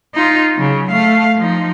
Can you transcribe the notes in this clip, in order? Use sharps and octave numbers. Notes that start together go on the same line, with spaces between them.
D#4 F4
C#3 F#3
A3 F5
F3 D#4